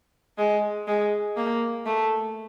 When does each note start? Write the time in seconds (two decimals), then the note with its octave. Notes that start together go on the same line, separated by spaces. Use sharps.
0.38 G#3
0.88 G#3
1.37 A#3
1.86 A3